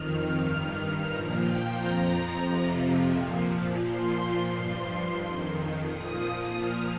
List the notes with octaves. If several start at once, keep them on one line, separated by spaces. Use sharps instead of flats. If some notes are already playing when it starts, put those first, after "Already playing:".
Already playing: F2 D#3 F6
G2 D#3 F6
A#2 F3 A#5
G5
F2 F3 A#5
F2 C3 F3
A#2 F3
A#2 F3 C6
G2 F3 C6
F2 D#3
A#2 F3 D#6
A#2 F3 F6